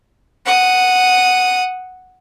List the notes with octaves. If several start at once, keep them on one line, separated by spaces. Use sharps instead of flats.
F#5 D#6